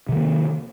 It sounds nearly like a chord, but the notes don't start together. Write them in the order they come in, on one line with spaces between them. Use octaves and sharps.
C3 D#3 A#3